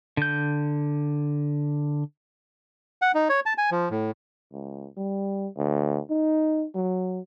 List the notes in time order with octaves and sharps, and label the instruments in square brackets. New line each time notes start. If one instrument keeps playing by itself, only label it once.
[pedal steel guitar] D3 G6
[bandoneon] F#5
D#4
C#5
A5
G#5
F3
A2
[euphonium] C#2
G3
D2
D#4
F#3